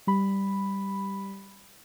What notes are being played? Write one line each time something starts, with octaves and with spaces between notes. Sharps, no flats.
G3 B5